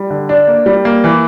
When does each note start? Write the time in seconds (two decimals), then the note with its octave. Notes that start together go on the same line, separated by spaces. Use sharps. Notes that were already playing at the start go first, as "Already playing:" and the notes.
Already playing: G3
0.10 D3
0.29 D4
0.47 A#3
0.66 G3
0.85 A#3
1.04 E3